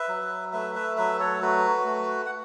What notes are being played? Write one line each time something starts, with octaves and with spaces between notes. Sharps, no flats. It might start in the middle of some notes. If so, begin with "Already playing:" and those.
Already playing: B4 E5
F#3
A3 B4 E5
B4 E5
F#3 B4 E5
A4 C#5
A3 F#4 B4
A3
F#5